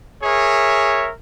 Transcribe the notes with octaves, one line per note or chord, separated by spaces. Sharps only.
G#4 A#4 C#5 E5